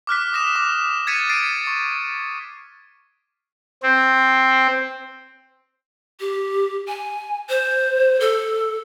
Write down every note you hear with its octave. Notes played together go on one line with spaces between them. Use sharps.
D6 F6 F#6 B6
D#6 A#6 E7
D6
G#6 A6 B6 C#7 D#7
A6 C7 D7 D#7
C#6
C4
G4
G#5
C5
A4